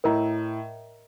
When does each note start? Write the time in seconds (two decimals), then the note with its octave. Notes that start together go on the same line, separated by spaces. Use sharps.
0.04 A2 A#4 D#5 A#5